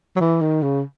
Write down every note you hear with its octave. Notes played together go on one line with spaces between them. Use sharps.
F#3
E3
D#3
C#3